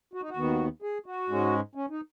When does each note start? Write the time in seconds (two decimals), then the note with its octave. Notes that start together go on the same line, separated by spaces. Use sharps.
0.13 F#4
0.22 D#4
0.29 F#4
0.36 D#2 D#3 B3
0.82 G#4
1.06 F#4
1.29 G#2 G#3 C#4
1.75 C#4
1.90 D#4